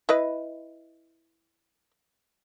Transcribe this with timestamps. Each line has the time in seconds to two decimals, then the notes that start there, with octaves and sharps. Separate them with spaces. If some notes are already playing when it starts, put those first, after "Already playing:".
0.09 E4 B4 D#5